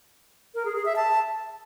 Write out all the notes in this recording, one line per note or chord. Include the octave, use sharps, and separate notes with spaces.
A#4
G#4
G#4
E5
A5